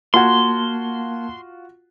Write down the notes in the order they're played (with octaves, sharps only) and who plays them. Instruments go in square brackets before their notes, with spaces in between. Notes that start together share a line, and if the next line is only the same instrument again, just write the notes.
[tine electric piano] A#3 A5 G#6 [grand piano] F4 F#4 [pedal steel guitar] C6